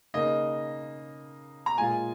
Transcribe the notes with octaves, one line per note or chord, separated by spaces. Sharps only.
C#3 A#3 D#4 D#5
A#5
A#2 G#3 F4 G#5